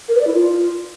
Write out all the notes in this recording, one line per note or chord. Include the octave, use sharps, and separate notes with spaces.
A#4
B4
D5
E4
F4